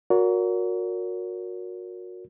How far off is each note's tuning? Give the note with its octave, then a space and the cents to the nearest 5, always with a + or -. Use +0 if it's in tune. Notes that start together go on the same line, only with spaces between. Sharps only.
F#4 -30 A#4 +0 C#5 +40